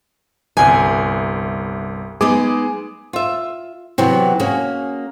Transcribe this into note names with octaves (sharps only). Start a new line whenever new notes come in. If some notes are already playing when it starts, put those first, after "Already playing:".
G1 C2 G#5
G#3 B3 D#4 G#4 D6
F4 E5
C3 E3 F#3 B3
A#3 C#4 F#4 G#4